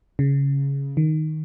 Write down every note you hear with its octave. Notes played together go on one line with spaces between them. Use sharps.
C#3
D#3